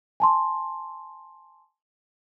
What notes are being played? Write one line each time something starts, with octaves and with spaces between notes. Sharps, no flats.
G#5 A5 C6